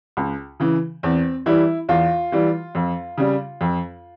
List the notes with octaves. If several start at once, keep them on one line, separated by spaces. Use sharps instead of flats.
C#2
C#3 E3
E2 C4
E3 G3 E4
E2 F4
E3 G3
F2
C#3 G3
F2